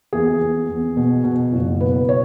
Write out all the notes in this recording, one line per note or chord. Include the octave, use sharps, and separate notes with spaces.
E2 G#4
E2
E2
B2
B2
F#1
B2 B4
C#5